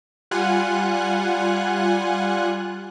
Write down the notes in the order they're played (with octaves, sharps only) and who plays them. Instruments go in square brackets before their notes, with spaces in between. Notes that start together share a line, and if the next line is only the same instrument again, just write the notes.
[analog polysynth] G3 F4 F#5 G#5 F#6